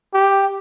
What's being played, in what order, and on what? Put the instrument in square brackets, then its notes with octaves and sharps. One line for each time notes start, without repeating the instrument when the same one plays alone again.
[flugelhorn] G4